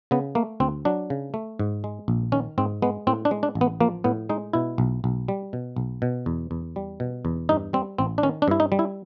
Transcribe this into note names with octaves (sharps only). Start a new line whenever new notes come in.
C#3 B3
A3 A#3
D2 C4
F#3 D4
C#3
A3
G#2
G#3
A#1
D#3 C#4
G#2 C4
G#3 B3
A2 C4
D4
G#3
D4
A1
B3
F3 A#3
A2 B3
G#3 D#4
B2 E4
B1
B1
G3
B2
B1
B2
E2
E2
G3
B2
E2
G2 D#4
G3 C4
A1 C4
D4
D#3 C#4
D4
G2 E4
D#4
G3
E4